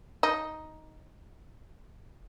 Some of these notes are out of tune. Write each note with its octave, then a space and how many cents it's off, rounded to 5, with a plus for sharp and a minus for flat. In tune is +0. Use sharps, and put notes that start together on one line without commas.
D#4 +5